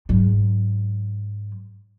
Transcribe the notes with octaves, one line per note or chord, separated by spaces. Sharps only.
G#2 F#3